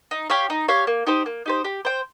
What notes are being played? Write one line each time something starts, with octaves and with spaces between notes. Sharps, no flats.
D#4
G4 C#5 F5
D#4
G4 C#5 F5
A#3
D#4 G4 C5
A#3
D#4 G4 C5
G4
C5 G5